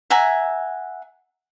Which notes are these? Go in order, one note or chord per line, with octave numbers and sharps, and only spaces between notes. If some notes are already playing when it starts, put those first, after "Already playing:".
E5 F#5 G#5 A#5